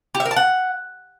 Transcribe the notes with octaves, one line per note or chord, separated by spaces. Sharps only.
G4
E5
A#4
A5
F#5